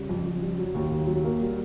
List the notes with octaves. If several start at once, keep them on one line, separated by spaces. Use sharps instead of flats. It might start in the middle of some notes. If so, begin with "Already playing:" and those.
Already playing: C#3 G3
F2
F2
G3
F#3
D#2
D#2
F#3
A#3
G3